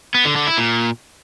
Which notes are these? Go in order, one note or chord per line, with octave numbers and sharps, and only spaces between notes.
B3
D3
D3
E4
A#2